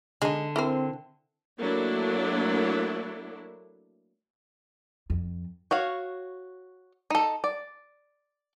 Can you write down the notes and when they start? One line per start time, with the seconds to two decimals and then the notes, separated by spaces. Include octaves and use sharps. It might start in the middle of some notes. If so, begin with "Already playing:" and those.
0.22 D3 G#3 D#4
0.56 C4 E4 A#4 C5
1.59 F#3 A3 A#3 D4 E4
5.10 F2
5.71 F#4 C#5 F5
7.10 D#4 A4
7.44 D5